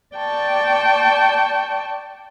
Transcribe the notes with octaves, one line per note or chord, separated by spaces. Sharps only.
D5 G5 A5 C#6